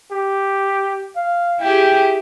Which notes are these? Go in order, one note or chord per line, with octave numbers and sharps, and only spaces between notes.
G4
F5
E4 G4 G#4 G5